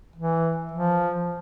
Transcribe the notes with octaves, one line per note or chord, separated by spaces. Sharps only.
E3
F3